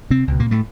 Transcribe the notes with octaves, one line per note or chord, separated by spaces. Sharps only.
C3 C4
C#2 B2
A#2 A#3
A2 A3